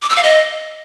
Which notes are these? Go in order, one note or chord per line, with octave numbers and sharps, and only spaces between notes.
D6
E6
F5
D#5